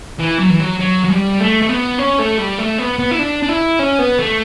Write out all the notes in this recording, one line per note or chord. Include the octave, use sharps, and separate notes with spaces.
E3
F#3
E3
F#3
F#3
F#3
G3
A3
A3
B3
C#4
A3
G3
A3
B3
B3
E4
D4
D4
E4
C#4
B3
A3